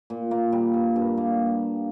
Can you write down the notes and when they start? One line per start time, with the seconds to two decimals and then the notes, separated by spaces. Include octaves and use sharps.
0.10 A#2
0.31 A#3
0.52 G3
0.74 G2
0.96 G2
1.17 A#3